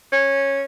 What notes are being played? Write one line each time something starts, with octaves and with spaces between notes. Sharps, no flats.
C#4